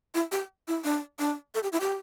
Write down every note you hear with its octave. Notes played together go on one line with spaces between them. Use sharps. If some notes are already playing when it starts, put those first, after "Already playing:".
E4
G4
E4
D4
D4
A4
G4
E4
G4